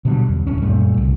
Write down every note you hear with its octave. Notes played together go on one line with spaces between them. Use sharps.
B2 D3 F#3 G3
E2
D1 C#4
F#2 A#2 G3 A3
C2